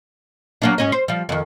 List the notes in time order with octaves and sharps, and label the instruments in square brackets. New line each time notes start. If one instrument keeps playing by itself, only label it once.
[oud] F#3 A#3 D4
G#2 C#4 D#5
C5
F3 G3
F2 D#3